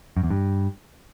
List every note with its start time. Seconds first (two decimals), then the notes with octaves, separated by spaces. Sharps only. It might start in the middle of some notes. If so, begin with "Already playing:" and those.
0.17 F#2
0.24 E2
0.30 G2